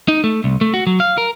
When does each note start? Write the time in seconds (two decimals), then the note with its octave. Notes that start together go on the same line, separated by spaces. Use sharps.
0.08 D#4
0.24 A3
0.44 C2
0.61 A3
0.74 F#4
0.87 F#3
1.00 F5
1.18 A#4